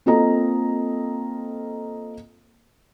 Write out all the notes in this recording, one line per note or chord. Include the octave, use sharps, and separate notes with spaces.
A#3 C4 F4 A4 D#5 A#5